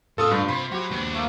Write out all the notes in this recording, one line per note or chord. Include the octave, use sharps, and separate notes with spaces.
A2 C#3 F4 A4 D#6 E6
G2 C#5
C3 C5 B5
F#3 F#4 G4
D#2 D4 B4 C#5
A3 A#3